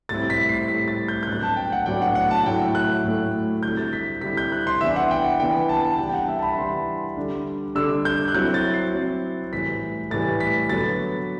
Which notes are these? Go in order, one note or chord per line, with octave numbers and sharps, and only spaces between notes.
A2 G3 C4 E4 A6
B6
C7
A2 G3 C4 E4 B6
A6
G6
G6
A2 F#3 B3 D4 F#6
A5
G5
F#5
A2 F#3 B3 D4 G5
F#5
F#5
A5
A2 F#3 A3 E4 G5
F#6
A2 F#3 A3 E4
D3 G3 C4 E4 G6
A6
B6
D3 G3 C4 E4 B6
G6
F#6
C6
E3 B3 D4 E5
F#5
G5
F#5
E3 B3 D4 G5
A5
A5
E3 G3 D4 G5
G5
F#5
E5
A5
B5
E3 G3 D4 C6
D3 G3 D4
D3 G3 D4 E6
G6
F#6
F#3 C4 E4 G6
A6
C7
F#3 C4 E4
A2 E3 G3 B6
A2 E3 G3 A6
B6
D3 F#3 B3 A6